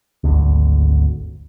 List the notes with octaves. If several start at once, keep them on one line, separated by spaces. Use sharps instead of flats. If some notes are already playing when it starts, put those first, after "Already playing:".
G#1 D2